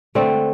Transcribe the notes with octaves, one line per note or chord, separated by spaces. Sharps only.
D3 A3 C4